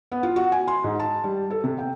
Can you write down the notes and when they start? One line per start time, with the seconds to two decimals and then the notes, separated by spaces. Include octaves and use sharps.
0.12 B3
0.23 F4
0.36 F#4
0.52 G#5
0.68 C6
0.84 G#2
1.00 A5
1.24 G3
1.50 A4
1.64 C3
1.78 G5